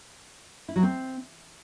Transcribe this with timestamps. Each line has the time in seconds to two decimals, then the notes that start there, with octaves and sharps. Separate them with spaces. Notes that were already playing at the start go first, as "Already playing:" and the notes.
0.69 E4
0.76 F#3
0.83 C4